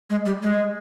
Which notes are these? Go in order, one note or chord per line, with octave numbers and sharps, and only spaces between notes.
G#3
G3
G#3